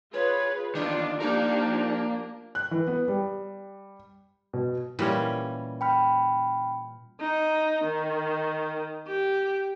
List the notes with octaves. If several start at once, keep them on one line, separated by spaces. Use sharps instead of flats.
F4 G#4 B4 C#5
E2 D#3 D4 F4 D5
F3 A#3 D4 D#4 G4 A#4
F#6
E3
B3
G3
B2
A#2 E3 G3 C#4
G5 B5 F6
D#4
D#3
G4